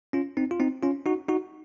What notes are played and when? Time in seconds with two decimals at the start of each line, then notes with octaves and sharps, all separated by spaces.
0.13 C#4 F4
0.37 C4 D#4
0.51 F4
0.60 C4 D#4
0.83 C#4 F4
1.06 D#4 F#4
1.29 D#4 F#4